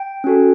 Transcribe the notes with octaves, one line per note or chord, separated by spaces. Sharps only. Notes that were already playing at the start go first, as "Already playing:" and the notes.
Already playing: G5
C#4 F#4 A4